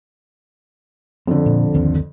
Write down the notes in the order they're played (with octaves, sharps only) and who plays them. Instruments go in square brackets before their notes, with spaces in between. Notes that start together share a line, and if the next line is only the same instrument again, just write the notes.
[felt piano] F2 D3 [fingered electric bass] C4
[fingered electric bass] A#2
G1 D#2 C4